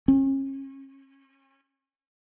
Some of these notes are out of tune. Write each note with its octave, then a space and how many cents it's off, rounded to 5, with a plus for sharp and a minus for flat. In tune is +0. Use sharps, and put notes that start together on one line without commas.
C#4 -35